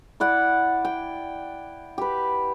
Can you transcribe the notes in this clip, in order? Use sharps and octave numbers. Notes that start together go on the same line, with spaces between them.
E4 D5 F#5
G5
G4 B4